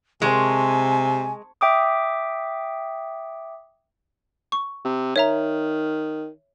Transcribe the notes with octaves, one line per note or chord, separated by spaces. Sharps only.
C3 G#3 G#5 A5 C6 C#6
E5 G5 D6 D#6
C#6
C3
D#3 C#5 E5 A#5